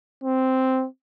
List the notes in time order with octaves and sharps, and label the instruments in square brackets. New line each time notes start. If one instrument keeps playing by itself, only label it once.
[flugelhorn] C4